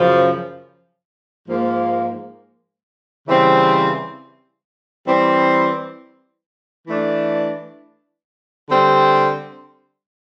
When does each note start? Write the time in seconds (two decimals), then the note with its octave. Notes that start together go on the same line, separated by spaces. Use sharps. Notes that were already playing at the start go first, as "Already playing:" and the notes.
Already playing: F#2 C#3 F3
1.47 G#2 F3 A#3
3.27 C#3 E3 G3 C4
5.07 E3 G3 C4
6.88 E3 A3 D4
8.68 D3 G3 C4